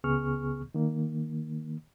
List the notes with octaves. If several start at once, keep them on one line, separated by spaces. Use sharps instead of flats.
C#2 C#3 B3 G#4 C#6 F6
D#3 A#3